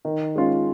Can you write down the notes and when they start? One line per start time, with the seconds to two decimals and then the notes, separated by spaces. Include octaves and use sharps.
0.05 D#3
0.36 G#3 C#4 F4